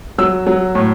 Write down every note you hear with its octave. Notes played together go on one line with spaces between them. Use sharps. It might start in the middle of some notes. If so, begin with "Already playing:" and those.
F#3 E6
F#3
A2